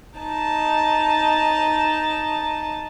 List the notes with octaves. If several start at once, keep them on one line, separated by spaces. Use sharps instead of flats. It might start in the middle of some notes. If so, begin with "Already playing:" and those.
D#4 A5